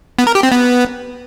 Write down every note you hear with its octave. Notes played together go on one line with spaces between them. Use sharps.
B3
A#4
G4
C4
B3